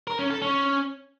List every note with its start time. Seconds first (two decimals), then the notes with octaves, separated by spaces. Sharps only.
0.07 A#4
0.19 C#4
0.30 A4
0.42 C#4